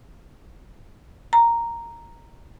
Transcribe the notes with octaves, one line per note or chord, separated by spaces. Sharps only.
A#5